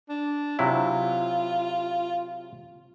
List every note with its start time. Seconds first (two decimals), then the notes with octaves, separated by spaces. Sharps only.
0.09 D4
0.59 C3 F#3 E4 F4